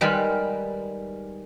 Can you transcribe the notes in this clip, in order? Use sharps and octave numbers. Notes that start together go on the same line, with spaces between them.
D#3 G3 G#3 B4